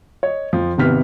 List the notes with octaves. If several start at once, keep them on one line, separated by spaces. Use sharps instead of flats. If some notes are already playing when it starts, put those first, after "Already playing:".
C#5 D#5
F2 F3
G#1 C3 B3 F6 B6